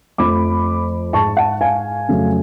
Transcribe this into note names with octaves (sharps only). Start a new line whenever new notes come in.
F2 F3 A3 B5 D6
G#2 G#3 A5 C#6
F#5 A5
F5 G#5
F2 C#3 F#3 A3